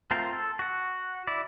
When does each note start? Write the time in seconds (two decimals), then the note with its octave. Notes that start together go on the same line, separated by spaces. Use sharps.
0.11 A3 C4 F4 A#4 C5
0.33 A4
0.59 F#4 F#5
1.27 E4 D5